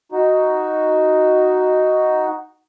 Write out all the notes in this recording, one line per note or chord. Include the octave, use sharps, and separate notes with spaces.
D#4 F#4